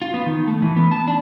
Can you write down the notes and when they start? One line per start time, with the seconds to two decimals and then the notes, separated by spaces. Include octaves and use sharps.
0.02 F4
0.14 B3
0.26 D#3
0.47 A3
0.62 E3
0.76 B3
0.91 A5
1.08 D4